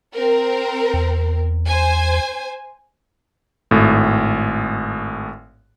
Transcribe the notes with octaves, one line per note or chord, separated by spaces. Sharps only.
C4 A#4
E2
C5 G#5
G#1 A2